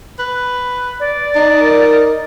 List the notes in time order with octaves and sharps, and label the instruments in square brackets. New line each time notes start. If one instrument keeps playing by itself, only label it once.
[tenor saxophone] B4
[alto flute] D5
[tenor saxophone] D#4
[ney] A#4